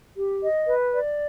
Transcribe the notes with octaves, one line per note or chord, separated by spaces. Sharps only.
G4
D#5
B4
D5